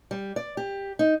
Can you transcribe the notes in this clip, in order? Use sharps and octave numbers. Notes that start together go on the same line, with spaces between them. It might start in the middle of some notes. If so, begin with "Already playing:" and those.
G3
D5
G4
D#4